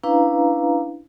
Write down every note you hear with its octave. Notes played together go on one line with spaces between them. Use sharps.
C#4 D4 E4 B4 F5 A#5